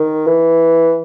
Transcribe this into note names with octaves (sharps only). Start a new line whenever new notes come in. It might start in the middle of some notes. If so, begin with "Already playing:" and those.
Already playing: D#3
E3